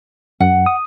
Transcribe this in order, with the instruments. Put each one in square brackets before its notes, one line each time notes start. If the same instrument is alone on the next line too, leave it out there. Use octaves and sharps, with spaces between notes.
[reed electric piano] F#2 [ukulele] F#5
[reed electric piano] D#6